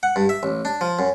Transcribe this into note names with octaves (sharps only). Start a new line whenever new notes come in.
F#5
G2
E5
A1
D4
F3
F#2